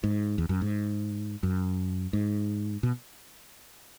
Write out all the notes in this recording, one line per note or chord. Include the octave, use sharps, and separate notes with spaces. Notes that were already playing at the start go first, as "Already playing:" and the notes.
G#2
E2
F#2
G#2
F#2
G#2
B2